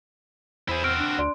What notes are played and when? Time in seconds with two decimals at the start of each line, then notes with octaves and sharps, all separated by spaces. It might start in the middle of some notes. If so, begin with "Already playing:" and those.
0.69 E2 E4 G#4 C5
0.84 C4 F#4 E6 F6 D7
0.98 D4
1.18 D2 D5 C6